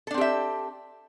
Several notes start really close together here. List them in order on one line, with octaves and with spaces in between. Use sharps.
A4 D4 C4 G4 E5